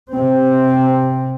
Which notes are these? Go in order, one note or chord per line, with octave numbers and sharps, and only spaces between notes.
C3 C4